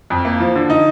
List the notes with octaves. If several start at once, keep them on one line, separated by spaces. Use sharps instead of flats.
F2
A#3
F3
D3
D#4